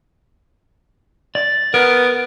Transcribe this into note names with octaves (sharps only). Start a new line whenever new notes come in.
D5
B3 A#4